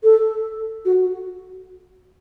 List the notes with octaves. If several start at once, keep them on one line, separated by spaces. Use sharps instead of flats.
A4
F#4